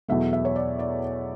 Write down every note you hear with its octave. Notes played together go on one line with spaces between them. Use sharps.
E2 B2 F#3 A3 E5
E5
C#5
D5
D5